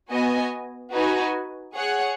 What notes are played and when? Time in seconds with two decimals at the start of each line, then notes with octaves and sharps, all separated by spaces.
0.10 B3 F#4 D#5 G#5
0.92 D#4 F#4 B4 G#5
1.74 G#4 C#5 F#5